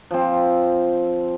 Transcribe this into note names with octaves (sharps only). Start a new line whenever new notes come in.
F3 C4